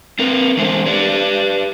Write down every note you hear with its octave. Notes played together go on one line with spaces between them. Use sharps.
C4 A#4 B4
E2 D3 G#3 C5
G4 B4 D5